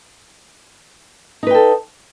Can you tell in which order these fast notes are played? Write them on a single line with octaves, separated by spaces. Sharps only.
D#4 B4 G5 A4